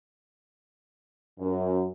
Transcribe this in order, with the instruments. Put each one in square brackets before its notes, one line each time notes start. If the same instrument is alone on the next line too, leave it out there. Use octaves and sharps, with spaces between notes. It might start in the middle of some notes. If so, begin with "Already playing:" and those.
[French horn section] F#2